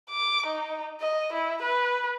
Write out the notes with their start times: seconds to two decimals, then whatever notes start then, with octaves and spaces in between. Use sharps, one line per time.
0.10 D6
0.47 D#4
1.01 D#5
1.33 E4
1.62 B4